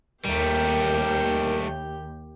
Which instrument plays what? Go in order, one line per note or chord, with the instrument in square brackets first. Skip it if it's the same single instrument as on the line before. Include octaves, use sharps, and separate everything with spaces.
[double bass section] D#2 [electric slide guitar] G3 A3 [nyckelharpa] G4 G5 [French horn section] A#4